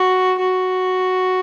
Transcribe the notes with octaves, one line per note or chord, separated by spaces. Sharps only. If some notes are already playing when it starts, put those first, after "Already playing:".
Already playing: F#4
F#4